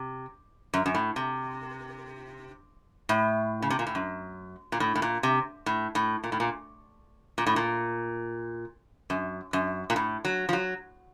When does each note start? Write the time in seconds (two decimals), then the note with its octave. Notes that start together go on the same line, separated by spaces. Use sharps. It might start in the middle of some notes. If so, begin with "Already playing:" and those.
Already playing: C3
0.74 F#2
0.86 F#2
0.95 A2
1.16 C3
3.09 A2
3.62 C#3
3.70 C3
3.79 A#2
3.87 A2
3.95 F#2
4.72 A#2
4.80 A2
4.95 A2
5.02 A#2
5.23 C3
5.66 A2
5.95 A2
6.24 A#2
6.32 A2
6.40 A#2
7.38 A#2
7.47 A2
7.56 A#2
9.10 F#2
9.53 F#2
9.90 A#2
9.96 A2
10.25 F#3
10.49 F3
10.53 F#3